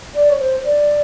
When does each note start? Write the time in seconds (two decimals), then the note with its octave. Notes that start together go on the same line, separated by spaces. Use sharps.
0.15 D5
0.30 C#5
0.39 C5
0.64 D5